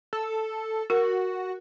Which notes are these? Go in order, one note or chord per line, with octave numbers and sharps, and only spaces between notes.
A4
F#4 A#4